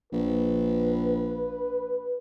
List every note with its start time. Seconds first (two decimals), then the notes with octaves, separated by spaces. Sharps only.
0.12 A#1 B4